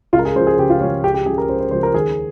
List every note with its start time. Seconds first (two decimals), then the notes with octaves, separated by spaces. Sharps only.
0.13 C#2 F4
0.19 A#4
0.25 G#4
0.36 C#3 C5
0.40 F3
0.47 G#4
0.59 C#2 G4
0.70 F4
0.81 C#3 F3 C#4
1.04 C#2 G4
1.14 G4
1.26 C#3 F3 G#4
1.38 A#4
1.48 C#2 C5
1.60 C5
1.71 C#3 F3 C5
1.83 A#4
1.94 D#2 G#4